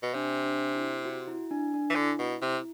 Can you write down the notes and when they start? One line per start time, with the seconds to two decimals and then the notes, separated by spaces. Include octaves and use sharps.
0.03 B2
0.14 C3 D4
0.45 D4
0.75 E4
1.05 F#4
1.28 E4
1.51 D4
1.74 D4
1.90 E3
1.95 D3 E4
2.19 B2
2.41 C3 E4